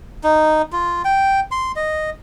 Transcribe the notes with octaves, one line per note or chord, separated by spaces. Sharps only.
D#4
F4
G5
C6
D#5